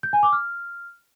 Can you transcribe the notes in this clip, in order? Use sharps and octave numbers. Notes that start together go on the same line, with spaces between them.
G6
G#5
D6
F6